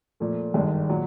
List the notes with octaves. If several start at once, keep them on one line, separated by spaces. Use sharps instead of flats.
A#2 F3 A3
G#1 G2 D#3 G#3
A#2 F#3